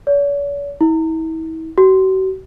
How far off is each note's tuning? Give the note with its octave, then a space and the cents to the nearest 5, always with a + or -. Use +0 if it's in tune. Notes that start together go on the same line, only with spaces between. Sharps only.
C#5 +45
E4 -40
F#4 +40